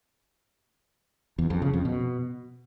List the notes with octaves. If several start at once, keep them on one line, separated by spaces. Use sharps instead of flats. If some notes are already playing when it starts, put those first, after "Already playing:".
E2
F2
C#3
F2
B2